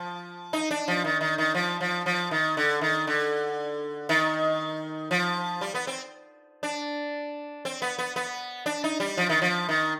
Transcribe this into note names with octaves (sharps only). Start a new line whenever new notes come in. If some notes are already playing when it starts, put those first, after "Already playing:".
Already playing: F3
D#4
D4
F3
D#3
D#3
D#3
F3
F3
F3
D#3
D3
D#3
D3
D#3
F3
G3
B3
C4
D4
C4
B3
B3
B3
D4
D#4
G3
F3
D#3
F3
D#3